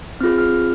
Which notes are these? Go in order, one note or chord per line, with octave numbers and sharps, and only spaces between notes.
C4 F4 G#4 F6
F6